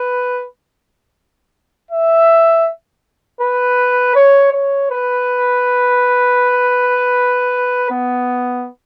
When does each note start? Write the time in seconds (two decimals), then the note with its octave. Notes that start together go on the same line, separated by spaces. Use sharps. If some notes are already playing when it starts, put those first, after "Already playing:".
Already playing: B4
1.91 E5
3.41 B4
4.16 C#5
4.53 C#5
4.91 B4
7.91 B3